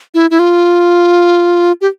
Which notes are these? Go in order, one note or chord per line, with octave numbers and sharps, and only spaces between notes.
E4
E4
F4
G4